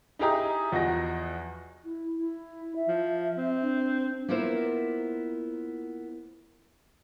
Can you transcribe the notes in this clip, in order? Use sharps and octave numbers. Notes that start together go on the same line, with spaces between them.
D#4 E4 G4 G#4 A#5 D#6
E2 F3 F#4 D#5 A#6
E4
E4
E5
F3
C4
D4
A#3 B3 E4 F4 A#4 C5